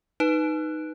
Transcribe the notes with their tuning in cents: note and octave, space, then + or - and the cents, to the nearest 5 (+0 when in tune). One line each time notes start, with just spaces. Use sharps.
D#4 +0 B4 +0